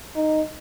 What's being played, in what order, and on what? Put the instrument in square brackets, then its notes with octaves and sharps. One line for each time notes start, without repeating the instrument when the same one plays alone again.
[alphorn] D#4